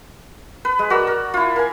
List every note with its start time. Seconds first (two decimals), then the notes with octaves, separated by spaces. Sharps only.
0.65 B4
0.79 G#3
0.90 F#4 A#4 D5 E6
1.07 A#4
1.34 E4 F4
1.56 A#4 G#5